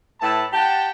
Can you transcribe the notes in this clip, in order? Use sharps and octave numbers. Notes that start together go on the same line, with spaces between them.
A2 E4 B4 A5
G4 F#5 G5 A5